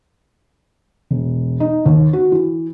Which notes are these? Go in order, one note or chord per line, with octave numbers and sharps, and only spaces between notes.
E1
D#4
D#2
F#4
E3